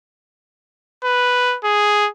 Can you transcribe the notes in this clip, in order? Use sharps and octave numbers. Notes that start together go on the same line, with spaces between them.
B4
G#4